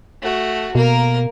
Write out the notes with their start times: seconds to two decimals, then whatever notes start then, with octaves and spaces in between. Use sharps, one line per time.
0.22 A3 F#4
0.75 B2 A#3 A#4